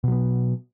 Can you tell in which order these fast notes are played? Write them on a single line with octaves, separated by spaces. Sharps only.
B2 F#3 B3